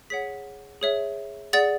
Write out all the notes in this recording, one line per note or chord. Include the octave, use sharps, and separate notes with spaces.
G#4 C#5 F#5 B6
G#4 C#5 E5
G#4 D5 F#5 A6